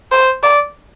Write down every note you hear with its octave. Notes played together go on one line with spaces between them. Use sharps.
C5
D5